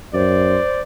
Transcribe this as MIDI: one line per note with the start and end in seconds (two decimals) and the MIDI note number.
0.14 0.58 42
0.14 0.81 72
0.14 0.83 74